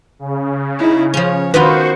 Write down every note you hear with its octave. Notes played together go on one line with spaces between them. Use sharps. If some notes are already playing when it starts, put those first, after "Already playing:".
C#3
D#4 E4
F3 C#4 C#5
D#3 B3 F4 F#4 B4 C5 C#6